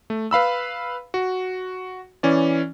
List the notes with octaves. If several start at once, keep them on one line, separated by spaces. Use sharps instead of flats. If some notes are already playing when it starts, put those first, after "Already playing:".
A3
B4 F5 B5 E6
F#4
E3 C#4 D5